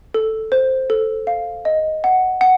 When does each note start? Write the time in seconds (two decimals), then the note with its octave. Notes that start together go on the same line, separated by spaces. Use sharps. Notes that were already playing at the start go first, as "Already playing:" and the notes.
0.14 A4
0.52 C5
0.90 A4
1.27 F5
1.65 D#5
2.04 F#5
2.41 F#5